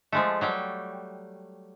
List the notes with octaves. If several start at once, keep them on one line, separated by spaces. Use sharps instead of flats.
F3 G#3 A3
F#3 G3 G5